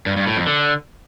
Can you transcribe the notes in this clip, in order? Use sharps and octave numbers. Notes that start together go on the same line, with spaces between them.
G2
G2
A2
F2
D3